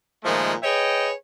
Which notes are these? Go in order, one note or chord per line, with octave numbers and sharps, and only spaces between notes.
A#2 D#3 F3 G#3 A3
G#4 B4 C#5 D#5 G5